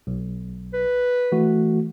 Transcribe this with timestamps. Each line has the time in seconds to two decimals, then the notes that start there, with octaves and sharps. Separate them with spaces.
0.07 B1
0.73 B4
1.32 E3 A3 F#4